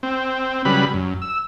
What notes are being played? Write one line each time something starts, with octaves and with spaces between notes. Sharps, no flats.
C4
C#3 F#3 G3 B4 B5
F#2
E6